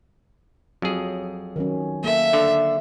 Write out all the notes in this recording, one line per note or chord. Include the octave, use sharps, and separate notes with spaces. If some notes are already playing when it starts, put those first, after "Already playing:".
F2 F#3 G#4
D#3 F#3 C#4
A#3 A4 E5
D3